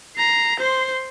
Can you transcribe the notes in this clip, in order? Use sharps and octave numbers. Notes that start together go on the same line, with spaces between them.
A#5 C7
C5 C6